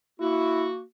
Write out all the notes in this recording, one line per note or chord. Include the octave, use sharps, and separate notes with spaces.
A#3 E4 F#4